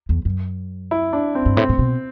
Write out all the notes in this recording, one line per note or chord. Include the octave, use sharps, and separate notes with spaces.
E2
F#2
E4
D4
C4
G2
A2 C4
A2
B2